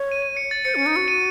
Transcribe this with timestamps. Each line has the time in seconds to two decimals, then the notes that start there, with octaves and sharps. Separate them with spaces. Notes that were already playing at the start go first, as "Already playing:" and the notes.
Already playing: C#5
0.12 D#7
0.22 D#7
0.37 C#7
0.51 A6
0.65 C5 C#7
0.75 C#4
0.78 C#7
0.86 D#4
0.93 C#7
0.96 F#4
1.08 D#7